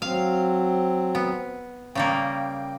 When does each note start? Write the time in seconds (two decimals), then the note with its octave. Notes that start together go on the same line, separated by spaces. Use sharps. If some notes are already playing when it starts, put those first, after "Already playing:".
0.02 F#3 C4 F5
1.15 B3
1.95 C#3 G3 A#3 G5